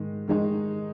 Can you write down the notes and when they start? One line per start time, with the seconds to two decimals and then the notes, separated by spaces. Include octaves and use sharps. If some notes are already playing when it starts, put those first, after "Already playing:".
Already playing: G#2 D#3 G#3
0.28 D#3 G#3 D#4